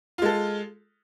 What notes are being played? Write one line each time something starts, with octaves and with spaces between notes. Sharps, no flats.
G#3 F4 A4